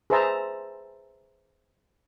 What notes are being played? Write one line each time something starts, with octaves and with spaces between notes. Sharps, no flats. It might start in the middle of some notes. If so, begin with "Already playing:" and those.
G#4 B4 C5 E5 A5 A#5